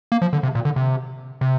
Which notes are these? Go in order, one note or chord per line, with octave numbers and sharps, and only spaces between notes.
A#3
F3
D3
C3
A#2
D3
C3
C3